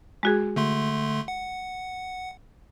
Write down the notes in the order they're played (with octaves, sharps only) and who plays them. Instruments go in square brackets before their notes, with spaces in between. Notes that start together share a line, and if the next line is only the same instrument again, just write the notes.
[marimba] G#3 F#4 G#4
[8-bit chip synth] D3 A3 C6
F#5